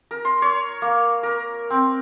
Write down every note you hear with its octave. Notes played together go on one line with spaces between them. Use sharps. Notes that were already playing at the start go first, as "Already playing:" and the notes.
A#4
C6
C#5
A#3
A#4
C4